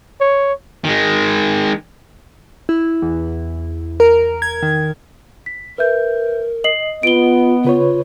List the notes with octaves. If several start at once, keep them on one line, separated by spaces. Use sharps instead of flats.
C#5
D#3 G#3
E4
E2
A#4
G#6
D#3
B6
A#4 B4 E5 G6
D#5 C7 F#7
B3 F4 D7 G7
C#3 F4 B4 C#5